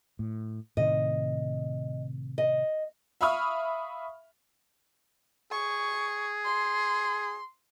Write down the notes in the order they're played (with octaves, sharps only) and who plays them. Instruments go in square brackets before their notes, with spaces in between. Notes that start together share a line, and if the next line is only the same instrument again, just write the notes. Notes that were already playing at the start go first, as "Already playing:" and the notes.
[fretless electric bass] A2
[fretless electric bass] A2 C3 D#3 [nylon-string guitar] D#5
[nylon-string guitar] D#5
[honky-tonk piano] E5 F5 B5 C#6 D#6 F6
[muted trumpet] G#4 [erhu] C#6
[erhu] C6